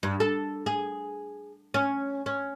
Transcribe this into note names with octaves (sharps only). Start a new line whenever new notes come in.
G2
A4
G#4
C#4
C#4